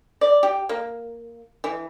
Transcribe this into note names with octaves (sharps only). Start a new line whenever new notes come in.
D5
G4
A#3
E3